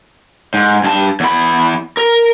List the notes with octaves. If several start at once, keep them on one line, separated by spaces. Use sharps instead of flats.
G#2
G2 A5
E2 B5
A#4